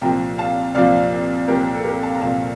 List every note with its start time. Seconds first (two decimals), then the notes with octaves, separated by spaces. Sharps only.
0.01 C2 A#2 F3 G5 A#5
0.38 F5 A5
0.75 C2 A#2 F3 D5 F5
1.48 C2 A#2 F3 G4 A#4
1.75 A4
1.84 G4 A#4
2.03 F5 A5
2.15 A#5
2.21 C2 A#2 F3 F5 A5